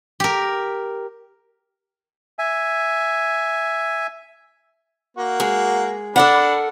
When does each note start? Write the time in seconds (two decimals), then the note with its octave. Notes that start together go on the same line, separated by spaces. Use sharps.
0.20 G4 A#4
2.39 E5 G#5
5.17 A#3 F#4
5.40 G#3
6.16 D4 A4 A#4 D5 F#5 B5